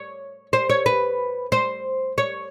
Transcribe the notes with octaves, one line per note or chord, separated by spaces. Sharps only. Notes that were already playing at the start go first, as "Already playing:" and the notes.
Already playing: C#5
C5
C#5
B4
C5
C#5